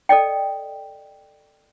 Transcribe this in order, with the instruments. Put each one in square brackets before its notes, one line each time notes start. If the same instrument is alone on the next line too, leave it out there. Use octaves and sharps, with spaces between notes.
[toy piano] A4 D5 D#5 G5